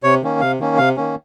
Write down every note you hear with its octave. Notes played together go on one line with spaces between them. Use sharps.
C3 C#5
D#3 A#3 C#4
C3 F5
D#3 A#3 C#4
C3 F5
D#3 A#3 C#4